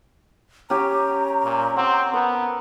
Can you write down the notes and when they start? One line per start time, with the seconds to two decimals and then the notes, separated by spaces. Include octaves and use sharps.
0.70 C#4 G4 A#5
1.45 A#2
1.76 C4 F#5
2.13 B3 A#4